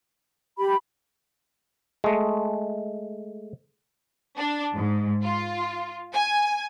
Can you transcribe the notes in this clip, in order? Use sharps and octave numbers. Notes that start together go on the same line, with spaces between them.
G4 B5
G#3 A3
D4
G#2
F4
G#5